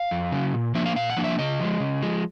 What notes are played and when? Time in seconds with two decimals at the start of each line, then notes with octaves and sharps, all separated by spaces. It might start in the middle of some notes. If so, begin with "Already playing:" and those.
Already playing: F5
0.11 F2
0.32 C#3 F#3
0.54 A#2
0.75 F3 A#3 D4 E5
0.86 F5
0.96 A#2 F5
1.10 F#5
1.17 F3 A#3 D4
1.24 E5
1.39 C#3 D#5
1.60 F3 G#3
1.80 C#3
2.02 F3 G#3